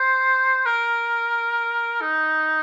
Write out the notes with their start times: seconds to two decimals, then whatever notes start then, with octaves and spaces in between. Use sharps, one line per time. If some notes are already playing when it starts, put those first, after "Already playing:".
Already playing: C5
0.66 A#4
2.01 D#4